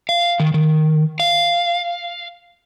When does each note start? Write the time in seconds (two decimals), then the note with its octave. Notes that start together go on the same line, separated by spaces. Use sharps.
0.09 F5
0.40 D#3
0.54 D#3
1.20 F5